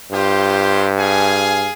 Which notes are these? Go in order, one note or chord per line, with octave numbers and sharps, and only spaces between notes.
G2 F4 G4 C5
G#4 F5 G#5